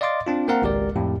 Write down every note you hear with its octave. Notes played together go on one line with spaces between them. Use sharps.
D5 D#5 F5 C6 D6 A6
C4 D4 F4
A#3 C4 A#4 F5 F#5 A#5
G#1 C#2 G#3 G4 A#4 D5
F2 A2 G4